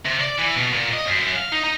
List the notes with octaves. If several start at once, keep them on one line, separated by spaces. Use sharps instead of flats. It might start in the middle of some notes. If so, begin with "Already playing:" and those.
C3
D5
E3
B2
A#2
D#5
F#2
F#2
F5
D#4
D#4